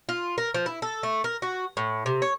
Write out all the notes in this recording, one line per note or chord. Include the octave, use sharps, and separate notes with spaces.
F4
A#4
F3
E4
A4
A3
A#4
F#4
A2
C3
C#5